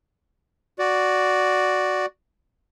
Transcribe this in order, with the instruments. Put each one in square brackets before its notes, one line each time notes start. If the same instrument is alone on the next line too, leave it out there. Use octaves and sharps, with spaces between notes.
[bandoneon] F#4 D5